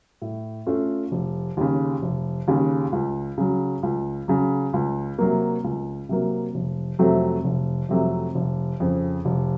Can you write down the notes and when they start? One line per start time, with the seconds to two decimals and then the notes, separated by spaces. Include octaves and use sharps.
0.22 A2
0.66 A3 C#4 F4
1.12 F1
1.57 D#2 C#3
2.02 F1
2.48 D#2 C#3
2.92 C#2
3.38 C#3 F#3
3.83 C#2
4.28 C#3 F#3
4.74 C#2
5.18 C3 F#3 A#3
5.64 C#2
6.09 C3 F#3 A#3
6.54 F1
6.99 F2 C3 F#3 A3
7.44 F1
7.89 F2 C3 F#3 A3
8.35 F1
8.80 F2 C#3
9.25 F1